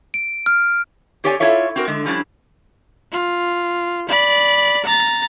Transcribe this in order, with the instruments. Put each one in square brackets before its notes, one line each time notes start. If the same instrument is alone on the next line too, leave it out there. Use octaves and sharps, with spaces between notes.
[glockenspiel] D7
F6
[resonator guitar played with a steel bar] C4 G4 C#5 D5 F#5 G#5
E4 F4 A4 C#5 E5
C4 F#4 A#4
D3 G#3
F3 G3 C#4 D4 E4
[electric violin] F4
D5 B5
A#5 A6